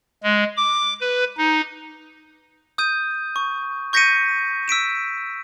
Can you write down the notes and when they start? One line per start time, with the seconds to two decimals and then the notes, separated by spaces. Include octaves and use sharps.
0.23 G#3
0.57 D6
1.01 B4
1.37 D#4
2.78 D#6 G6 D#7
3.36 C#6
3.93 C#6 G6 A#6 B6 C#7 D#7
4.68 E6 B6 D7 E7